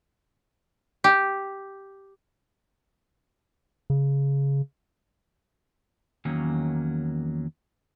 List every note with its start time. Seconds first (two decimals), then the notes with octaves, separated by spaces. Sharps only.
1.04 G4
3.90 C#3
6.25 E2 D#3 F#3 A#3 C#4